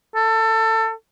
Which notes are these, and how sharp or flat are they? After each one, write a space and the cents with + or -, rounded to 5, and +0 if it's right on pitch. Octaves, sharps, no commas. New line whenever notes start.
A4 +25